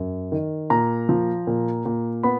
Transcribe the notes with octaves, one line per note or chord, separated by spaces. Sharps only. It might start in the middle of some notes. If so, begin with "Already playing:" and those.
Already playing: F#2
D#3
A#2 A#5
F3
A#2
A#2
B3 B5